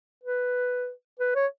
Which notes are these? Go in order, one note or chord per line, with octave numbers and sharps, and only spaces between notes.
B4
B4
C#5